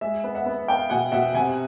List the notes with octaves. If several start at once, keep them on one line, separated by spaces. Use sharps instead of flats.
G#3 E5
B3
E5 F#5
B3
B3 F5 G5
B2 F#5 G#5
B2 E5 F#5
C3 F#5 G#5